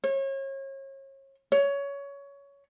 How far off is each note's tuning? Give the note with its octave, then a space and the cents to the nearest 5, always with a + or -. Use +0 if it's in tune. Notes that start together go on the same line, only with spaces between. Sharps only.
C#5 -35
C#5 +20